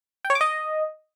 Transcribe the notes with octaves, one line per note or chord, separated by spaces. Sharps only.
G5
C#5
D6
D#5